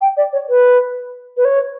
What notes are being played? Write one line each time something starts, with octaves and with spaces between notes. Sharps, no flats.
G5
D5
C#5
B4
B4
C#5